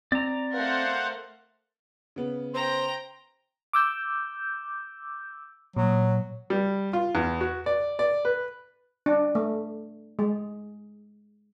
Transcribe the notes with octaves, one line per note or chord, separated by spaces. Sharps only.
C4 D5 A#5
A3 A#4 C5 F5 F#5
C#3 B3
C5 G5 A#5
D6 E6 G6
A#2 F#3
G3
F4
E2
F#4
D5
D5
B4
D4
A3
G#3